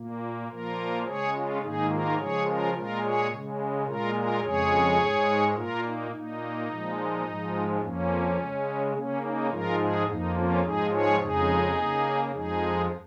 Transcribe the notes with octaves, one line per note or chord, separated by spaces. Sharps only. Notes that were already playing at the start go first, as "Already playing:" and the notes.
Already playing: A#2 A#3
A#2 F3 A#3 F4 A#4
C#3 G#3 G#4 C#5
C#4 F4
G#2 D#3 A#3 D#4 G#4
F4 A#4
C#3 F3 G#3 G#4 C#5
F4 A#4
A#2 G#3 F4 A#4
G#4 C#5
C#3 G#3
A#2 G#3 F4 A#4
F4 A#4
F2 C#3 G#3 G#4 C#5
G#2 G#3
A#2 A#3 F4 A#4
D#4
A#2 A#3 D#4
A#2 F3 G#3
G#2 F3 G#3
F2 F3 A#3 C#4
C#3 G#3
C#3 A#3 C#4
D#4
G#2 F3 G#3 F4 A#4
D#4 G#4
F2 F3 A#3 D#4
C#4 F4
G#2 F3 G#3 D#4 G#4
G#4 C#5
F2 C#3 G#3 D#4 G#4
C#3 A#3
F2 F3 G#3 D#4 G#4